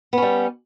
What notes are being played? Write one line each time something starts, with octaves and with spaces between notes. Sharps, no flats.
G3 B3 C#4